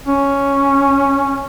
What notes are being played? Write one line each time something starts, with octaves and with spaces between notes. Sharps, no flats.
C#4